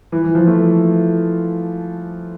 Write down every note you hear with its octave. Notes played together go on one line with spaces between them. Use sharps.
E3
E3
F3
A3